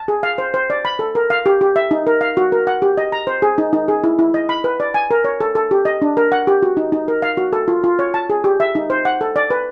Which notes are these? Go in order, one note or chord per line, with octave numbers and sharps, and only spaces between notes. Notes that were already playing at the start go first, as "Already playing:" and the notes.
Already playing: A5
G#4
F5
C5
C5
D5
B5
A4
A#4
F5
G4
G4
E5
D#4
A#4
F5
F#4
A#4
F#5
G4
D#5
A#5
C5
G#4
D#4
D#4
G#4
E4
E4
D#5
B5
B4
D5
G#5
A#4
C#5
A4
A4
G4
D#5
D4
A#4
F#5
G4
F#4
D#4
D#4
A#4
F5
F#4
A4
F4
F4
C#5
A5
G#4
G4
E5
D#4
C5
F#5
A4
D5
B4